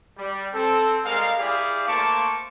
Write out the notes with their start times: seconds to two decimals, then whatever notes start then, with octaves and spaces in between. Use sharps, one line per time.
0.18 G3
0.53 C4 A4
1.04 G3 G#3 C4 A#4 F5
1.38 E4 G4 G#4 D5 F5
1.87 A3 A#3 C5 A5 C#6 D6